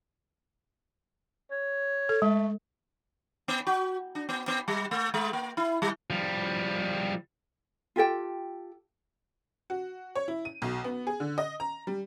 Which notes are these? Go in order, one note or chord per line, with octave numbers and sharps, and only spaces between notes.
C#5
A4
G#3 A3
B3
F#4
D4
B3
B3
G3
A3
G#3
A#3
E4
G3
F3 G3
F4 G4 A4 G5
F#4
C#5
E4
D#7
B1
B3
G#4
D3
D#5
A#5
G3